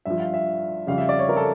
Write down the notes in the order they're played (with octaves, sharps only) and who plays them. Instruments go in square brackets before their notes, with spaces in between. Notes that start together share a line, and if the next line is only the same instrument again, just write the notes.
[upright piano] G2 F3 E5
F5
E5
F2 C#3 G3 F5
E5
D5
C#5
A#4
A4